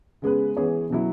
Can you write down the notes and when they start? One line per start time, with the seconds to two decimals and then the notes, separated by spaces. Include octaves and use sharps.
0.22 C#3 G#3 B3 G#4 B4
0.57 E3 B3 G#4 C#5
0.90 B2 F#3 E4